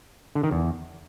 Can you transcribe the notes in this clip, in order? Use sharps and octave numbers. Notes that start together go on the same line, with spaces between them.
D3
D#3
E2